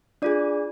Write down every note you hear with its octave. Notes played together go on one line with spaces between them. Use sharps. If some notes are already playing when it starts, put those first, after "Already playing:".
D4 F4 G#4 D5